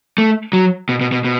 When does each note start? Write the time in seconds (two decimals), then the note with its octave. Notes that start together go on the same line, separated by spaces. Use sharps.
0.18 A3
0.53 F#3
0.89 B2
1.01 B2
1.12 B2
1.25 B2